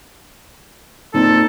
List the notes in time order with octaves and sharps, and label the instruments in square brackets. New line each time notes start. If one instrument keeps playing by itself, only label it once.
[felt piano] A#2 C4 [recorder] D#4 [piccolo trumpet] A4